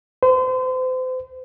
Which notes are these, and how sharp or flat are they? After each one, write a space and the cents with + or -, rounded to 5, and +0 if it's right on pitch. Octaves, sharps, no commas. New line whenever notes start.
C5 -35